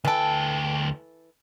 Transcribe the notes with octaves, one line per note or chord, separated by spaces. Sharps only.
D2 E3 A4 G5